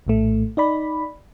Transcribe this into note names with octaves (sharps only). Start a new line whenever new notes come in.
A#1 A2 A3
D#4 D5 B5